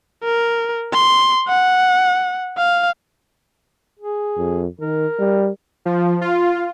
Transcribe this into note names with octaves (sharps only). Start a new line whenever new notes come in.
A#4
C6
F#5
F5
G#4
F2
D#3 A#4
G3
F3
F4